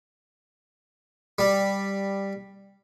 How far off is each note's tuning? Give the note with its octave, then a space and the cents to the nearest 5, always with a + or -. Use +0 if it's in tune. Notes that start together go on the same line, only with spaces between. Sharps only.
G3 +5